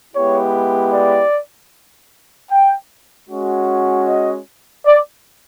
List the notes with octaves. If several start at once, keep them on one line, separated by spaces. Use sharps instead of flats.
G#3 B3 E4 G4 C#5
D5
G5
G#3 C#4 F#4
D#5
D5